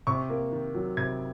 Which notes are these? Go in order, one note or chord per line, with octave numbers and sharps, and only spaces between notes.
C3 C#6
A#3
D#3
F#3
C3 G#6